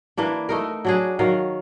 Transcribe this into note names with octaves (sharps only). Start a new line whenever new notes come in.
E3 A#3 D4
A3 D#4 A#4
F#3 D4 G#4
D#3 F#3 F5